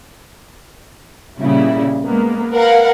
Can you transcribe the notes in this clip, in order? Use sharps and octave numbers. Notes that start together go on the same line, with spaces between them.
A#2 C#3 G3 E4
G#3 A#3 B3
A#4 B4 F5 F#5